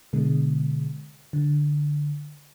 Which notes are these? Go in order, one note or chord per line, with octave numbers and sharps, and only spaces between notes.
B2 D3 G#3
D3